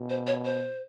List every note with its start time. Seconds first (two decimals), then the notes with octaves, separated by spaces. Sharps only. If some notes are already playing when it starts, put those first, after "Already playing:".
Already playing: B2
0.10 C5
0.27 C#5
0.45 C5